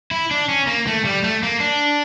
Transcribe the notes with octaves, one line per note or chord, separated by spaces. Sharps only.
E4
D4
C#4
A#3
A3
G3
A3
A#3
D4